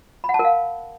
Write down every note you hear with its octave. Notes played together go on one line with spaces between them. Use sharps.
B5
F#5
A5
A#4
F5